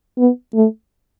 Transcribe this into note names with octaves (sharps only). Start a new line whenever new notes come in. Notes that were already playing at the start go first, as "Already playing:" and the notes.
B3
A3